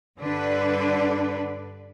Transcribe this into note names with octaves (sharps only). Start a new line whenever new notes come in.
G2 D3 D4 B4